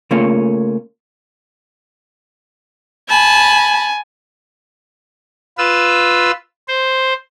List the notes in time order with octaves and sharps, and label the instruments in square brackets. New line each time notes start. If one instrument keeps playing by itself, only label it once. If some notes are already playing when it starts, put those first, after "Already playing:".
[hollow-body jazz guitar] C#3 A3 A#3 C#4 F4 C#5
[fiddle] G#5 [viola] A5 B5
[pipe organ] F4 B4 E6
C5